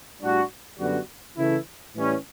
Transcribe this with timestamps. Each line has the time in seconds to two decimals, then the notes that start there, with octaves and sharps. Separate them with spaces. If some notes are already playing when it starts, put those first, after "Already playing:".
0.22 A2 G3 D4 F#4
0.79 F#2 D3 G3 B3 F#4
1.37 C#3 E3 A3 E4
1.95 A2 E3 G3 C#4